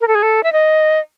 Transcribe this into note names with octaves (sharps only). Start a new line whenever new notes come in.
A#4
A4
G#4
A4
E5
D#5